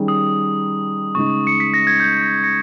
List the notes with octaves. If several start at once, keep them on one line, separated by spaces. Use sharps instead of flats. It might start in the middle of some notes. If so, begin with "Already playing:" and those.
Already playing: D#3 G3 C#4 G#4
D#6
C#3 G#3 D#4 C#6
C#7
B6
A#6
G#6
G6
A#6
A#6 C#7